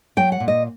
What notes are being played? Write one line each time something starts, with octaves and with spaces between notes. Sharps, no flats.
F#3 G5
F#5
A#2
D#5